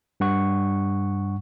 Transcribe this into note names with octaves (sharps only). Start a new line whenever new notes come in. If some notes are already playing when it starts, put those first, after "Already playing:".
G2 G3 F#5 C#6